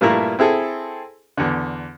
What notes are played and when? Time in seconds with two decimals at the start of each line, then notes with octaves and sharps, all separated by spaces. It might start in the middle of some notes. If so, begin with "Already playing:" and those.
0.01 G2 A#2 A3 A#3 E4 A#5
0.39 C4 E4 G#4 A4
1.37 E2 D3